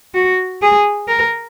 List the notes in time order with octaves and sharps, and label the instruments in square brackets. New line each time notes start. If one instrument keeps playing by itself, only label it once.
[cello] F#4
G#4
A#4